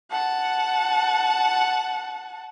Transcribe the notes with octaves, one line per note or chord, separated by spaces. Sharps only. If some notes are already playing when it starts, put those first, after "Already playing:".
F#5 A5